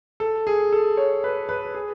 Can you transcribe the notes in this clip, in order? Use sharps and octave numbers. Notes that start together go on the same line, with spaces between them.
A4
G#4
A4
C#5
B4
B4
G#4